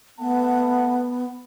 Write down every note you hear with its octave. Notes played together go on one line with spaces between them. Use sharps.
A3 B3 F#5 A5